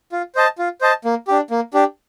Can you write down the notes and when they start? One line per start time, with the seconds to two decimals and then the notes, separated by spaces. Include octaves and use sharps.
0.12 F4
0.35 C5 D#5 A5
0.58 F4
0.81 C5 D#5 A5
1.05 A#3
1.28 D4 G4
1.50 A#3
1.74 D4 G4